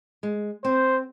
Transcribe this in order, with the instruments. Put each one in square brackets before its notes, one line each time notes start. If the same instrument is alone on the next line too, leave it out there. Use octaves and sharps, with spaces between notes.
[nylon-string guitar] G#3
[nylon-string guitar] C4 [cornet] C5